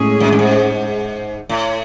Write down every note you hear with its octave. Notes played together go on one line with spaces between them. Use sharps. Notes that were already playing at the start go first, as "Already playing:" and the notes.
Already playing: A2 G#3 C#4 G#4
F#2
F#2
G#2
A2